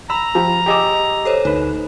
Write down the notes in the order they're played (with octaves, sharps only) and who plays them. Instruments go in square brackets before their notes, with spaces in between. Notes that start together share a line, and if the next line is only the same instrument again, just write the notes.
[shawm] A#5 [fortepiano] B5 [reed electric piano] E6
[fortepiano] F3 G4
[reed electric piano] G4 D#5 E6 [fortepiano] G#4 D6
[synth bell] A4 C5 C#5
[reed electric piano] D2 B4 [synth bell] D#4